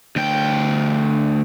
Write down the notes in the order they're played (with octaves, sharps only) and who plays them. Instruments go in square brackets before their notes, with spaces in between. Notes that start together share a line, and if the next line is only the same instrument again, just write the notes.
[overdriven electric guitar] D2 G5